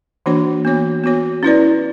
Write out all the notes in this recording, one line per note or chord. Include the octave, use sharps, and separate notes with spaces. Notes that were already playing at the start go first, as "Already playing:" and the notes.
E3 A#3 D4 F#4 C#5
B3 F#4 C#5
B3 F#4 C#5
C#4 E4 B4 D5